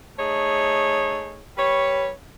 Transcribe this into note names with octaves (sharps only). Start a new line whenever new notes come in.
A3 D#4 G#4 C#5
G3 B4 C#5